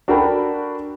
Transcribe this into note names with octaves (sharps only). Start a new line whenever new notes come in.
D4 F#4 A4 A#4 G5 B5